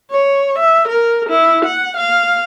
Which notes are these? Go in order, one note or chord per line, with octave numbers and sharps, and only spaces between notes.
C#5
E5
A#4
E4
F#5
F5